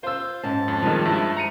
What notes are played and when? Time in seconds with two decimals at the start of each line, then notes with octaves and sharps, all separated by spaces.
0.03 F4 C5 E6
0.43 G#2 C#4 A5
0.68 F2
0.82 G2 D#3 F3 G#3
1.05 G2 E4
1.37 A#5 C#7 D#7